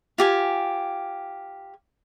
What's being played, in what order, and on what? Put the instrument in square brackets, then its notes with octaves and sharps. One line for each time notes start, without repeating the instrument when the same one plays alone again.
[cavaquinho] F4 G4 G#5